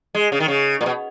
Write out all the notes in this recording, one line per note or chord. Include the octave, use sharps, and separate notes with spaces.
G#3
C#3
D#3
C#3
A#2
B2